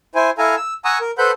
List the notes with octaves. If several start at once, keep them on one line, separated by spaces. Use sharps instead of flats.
E4 C5 G#5
E4 A4 F5 G#5 A#5
E6
F#5 G#5 A#5 C#6 D#6 E6
A#4
A4 B4 C5 F#5 B5 G6